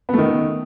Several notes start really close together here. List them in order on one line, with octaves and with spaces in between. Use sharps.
B3 A3 D#3